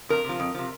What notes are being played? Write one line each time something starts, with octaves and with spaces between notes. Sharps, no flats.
F2 A#4
C3 F3
F2
C3 F3